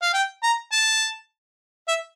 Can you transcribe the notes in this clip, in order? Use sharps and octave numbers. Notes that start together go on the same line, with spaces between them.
F5
G5
A#5
A5
E5